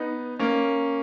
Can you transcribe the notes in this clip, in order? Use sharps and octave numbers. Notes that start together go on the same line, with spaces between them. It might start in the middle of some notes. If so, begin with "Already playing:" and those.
Already playing: B3 D#4
A#3 C#4